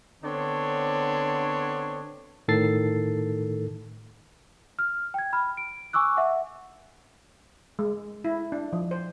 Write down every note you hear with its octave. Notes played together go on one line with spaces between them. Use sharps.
D3 B3 C4 D4 C#5
A2 D#3 A4 A6 C7
F6
G5 G#6
B5 F6
D7
G#5 C#6 D6 E6 F#6
E5 F#5
G#3
E4
D4
F3
C5